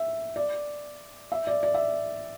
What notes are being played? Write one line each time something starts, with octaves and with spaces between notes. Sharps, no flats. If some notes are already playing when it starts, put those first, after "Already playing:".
Already playing: E5
D5
E5
D5
D5
E5